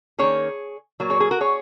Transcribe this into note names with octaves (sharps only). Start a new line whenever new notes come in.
D#3 A#3 C#4 G#4 C#5
A#2 F#3 A#3
G#4 C#5
G#4
F#4 A#4
G#4 C#5